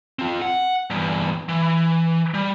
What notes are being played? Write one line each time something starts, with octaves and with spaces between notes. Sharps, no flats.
C4 F4
F#5
E2 G2
E3
G3